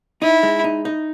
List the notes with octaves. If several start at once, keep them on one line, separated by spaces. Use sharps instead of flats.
D#4 E4
G#3
D#4
D#4